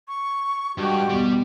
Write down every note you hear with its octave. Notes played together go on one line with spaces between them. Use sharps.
C#6
G2 G#3 F#4 G4 G5
E2 B2 G3